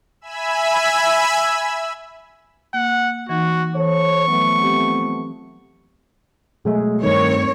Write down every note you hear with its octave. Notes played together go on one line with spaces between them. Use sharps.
E5 G#5 B5 E6
A#3 F#5
E3 D#4 F#4
E3 A4 C5 C#5 C#6
F3 F#3 A3 B3
C4 G4
B2 F#3 G#3 A3
G2 D#3 G3 A3 C4 C#5